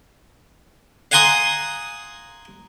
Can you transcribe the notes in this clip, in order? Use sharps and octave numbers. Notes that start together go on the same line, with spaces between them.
F5 F#5 G#5 A#5 C6 D#6